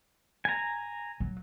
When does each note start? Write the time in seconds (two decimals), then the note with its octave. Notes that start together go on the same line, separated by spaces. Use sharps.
0.45 G#5 A#5
1.20 F#3